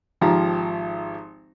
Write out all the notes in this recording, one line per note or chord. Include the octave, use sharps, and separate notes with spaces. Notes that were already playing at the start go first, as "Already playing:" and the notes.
G#1 F3 G4 A#5